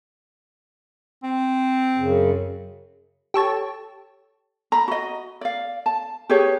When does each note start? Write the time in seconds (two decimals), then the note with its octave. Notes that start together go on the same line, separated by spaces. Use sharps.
1.23 C4
1.97 F#2 C#3
3.34 G4 A4 C#5 A5
4.72 A#5 B5
4.88 F#4 D#5
5.41 D5 F5
5.86 A5
6.29 G4 G#4 B4 C#5